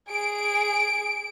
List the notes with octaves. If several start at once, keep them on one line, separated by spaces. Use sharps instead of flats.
G#4 D7